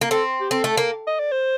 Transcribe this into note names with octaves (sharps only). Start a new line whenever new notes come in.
A#3
C4 A4
G4
C4 A4
A3
A#3
D#5
D5
C5